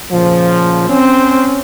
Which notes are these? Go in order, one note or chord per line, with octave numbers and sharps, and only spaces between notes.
A#2 C#3 F3
C4 C#4